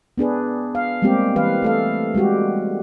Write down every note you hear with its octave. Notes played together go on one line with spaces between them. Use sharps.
B3 D4 G#4 B4
F5
G3 G#3 A#3 C4 G4
E3 B4 F5
A3 A4 F5
G3 G#3 F#4 G4